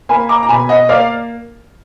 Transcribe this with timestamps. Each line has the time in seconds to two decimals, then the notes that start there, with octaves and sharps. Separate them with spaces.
0.09 A#3 G#5 B5
0.29 A#5 D6
0.43 A#5
0.49 B2 G#5 B5
0.69 D#5 F#5
0.89 A#3 D5 F5